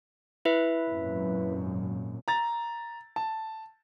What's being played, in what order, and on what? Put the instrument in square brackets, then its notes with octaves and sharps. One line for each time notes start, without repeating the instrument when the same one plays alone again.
[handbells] E4 B4 E5
[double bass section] G#1 F#2 A#2
[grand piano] A#5 A6
A5